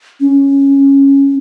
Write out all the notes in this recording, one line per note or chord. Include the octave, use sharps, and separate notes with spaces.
C#4